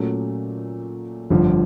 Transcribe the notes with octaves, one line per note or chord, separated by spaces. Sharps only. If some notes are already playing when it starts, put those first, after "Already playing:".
Already playing: A#2 F#3 A3 C#4
G1 F2 D3 F3